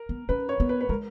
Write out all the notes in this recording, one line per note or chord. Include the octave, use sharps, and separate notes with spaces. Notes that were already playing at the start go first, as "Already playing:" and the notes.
Already playing: A#4
B3
C#4 B4
C#5
B3
B4
B4
G#3 A#4